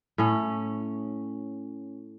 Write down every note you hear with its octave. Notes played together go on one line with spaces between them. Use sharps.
A2 C#4